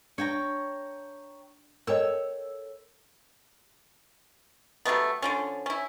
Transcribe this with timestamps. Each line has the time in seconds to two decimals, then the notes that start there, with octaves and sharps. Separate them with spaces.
0.18 D4 C#5 G5 A#5
1.87 A4 A#4 C#5 D#5 G5 E6
4.85 F#3 G3 A3 B3
5.22 D3 F3 C#4
5.66 C#4 E4